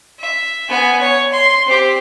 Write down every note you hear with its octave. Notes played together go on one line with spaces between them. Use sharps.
E5
B3 G#5
C#5
C6
C4 G4